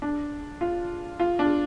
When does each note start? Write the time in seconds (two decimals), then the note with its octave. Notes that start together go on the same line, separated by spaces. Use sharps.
0.02 D4
0.61 F4
1.20 F4
1.39 D4